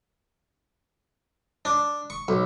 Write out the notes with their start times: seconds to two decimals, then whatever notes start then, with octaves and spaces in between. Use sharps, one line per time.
1.65 D4
2.10 C#6
2.28 B1